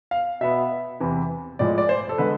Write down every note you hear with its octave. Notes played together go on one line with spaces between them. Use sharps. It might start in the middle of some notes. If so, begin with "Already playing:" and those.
F5
B2 B3 E5
E2 C3 E3
A2 F3 G#3 D5
D5
C5
A4
D3 G#3 B4